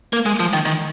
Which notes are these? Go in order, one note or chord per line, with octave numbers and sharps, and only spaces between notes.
A#3
G#3
F3
D#3
D#3